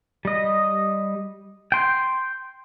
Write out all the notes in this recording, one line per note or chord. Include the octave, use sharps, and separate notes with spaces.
G3 D#5
G5 C6